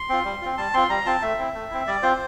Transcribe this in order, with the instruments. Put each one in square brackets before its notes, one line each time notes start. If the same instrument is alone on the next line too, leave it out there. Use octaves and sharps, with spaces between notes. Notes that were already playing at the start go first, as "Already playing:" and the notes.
Already playing: [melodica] C6
C4 F4
G3
C4 F4
G3 A5
C4 F4 C6
G3 A#5
C4 F4 A5
A3 E5
C4 E4
A3
C4 E4
G3 D5
C4 F4 C5